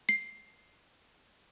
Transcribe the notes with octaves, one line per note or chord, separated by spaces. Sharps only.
C7